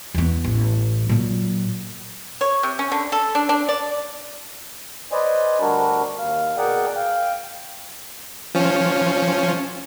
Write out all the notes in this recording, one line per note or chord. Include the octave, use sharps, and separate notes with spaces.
E2 B3
A1
A#2 F#3
C#5
C3
C#4
D3
A4
D4
D4
D5
B4 C5 D5 D#5 G#5
D2 G3 D4 F#4 A#4
D#2 F5
B2 G#4 A#4 D5 F#5 G5
F5 G5
F3 C#4